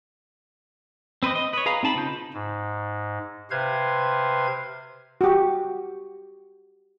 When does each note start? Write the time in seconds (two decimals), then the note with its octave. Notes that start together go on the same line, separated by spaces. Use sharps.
1.23 C4 B4 C5 D#5
1.35 D#5
1.53 B4 C#5
1.66 G#4 B4 F5 A#5
1.83 C4 D#4 A5 B5
1.96 C#3 D#4 F4 G6
2.33 G#2
3.51 C3 B4 C5 F5 G#6
5.21 F#4 G4